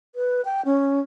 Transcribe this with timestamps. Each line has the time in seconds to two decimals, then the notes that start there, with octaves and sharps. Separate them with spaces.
0.15 B4
0.45 G5
0.65 C#4